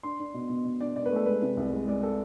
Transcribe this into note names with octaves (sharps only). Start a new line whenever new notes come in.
D4 C6
D4
B2
B2
B2
D4 D5
B2 D5
B4
A3
A4
G#3 B4
C3
C2
G#3
G#3 D5
A4